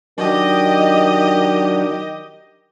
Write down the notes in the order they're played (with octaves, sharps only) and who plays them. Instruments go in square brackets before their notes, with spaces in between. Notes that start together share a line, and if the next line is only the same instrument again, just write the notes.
[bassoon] D#3 [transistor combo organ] F#3 D4 [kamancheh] G4 D#5